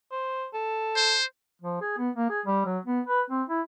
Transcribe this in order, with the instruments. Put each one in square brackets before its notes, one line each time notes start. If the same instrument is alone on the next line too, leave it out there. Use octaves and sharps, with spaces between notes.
[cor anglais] C5
A4
[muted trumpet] C5
[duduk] F3
G#4
B3
A#3
G#4
G3
F#3
B3
B4
C4
E4